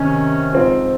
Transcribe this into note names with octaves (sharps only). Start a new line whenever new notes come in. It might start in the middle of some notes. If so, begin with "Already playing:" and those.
Already playing: C3 D#3 C#4
G#2 F3 C4 F4